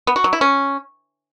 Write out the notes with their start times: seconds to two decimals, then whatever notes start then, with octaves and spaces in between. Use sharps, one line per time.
0.07 B3
0.16 F#4
0.24 F#3
0.33 E4
0.41 C#4